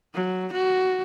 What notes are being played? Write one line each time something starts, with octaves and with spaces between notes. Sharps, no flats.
F#3
F#4